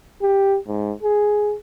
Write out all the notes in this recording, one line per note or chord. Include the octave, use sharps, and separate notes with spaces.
G4
G#2
G#4